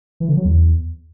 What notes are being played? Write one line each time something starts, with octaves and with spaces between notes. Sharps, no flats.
E3
D3
F#3
E2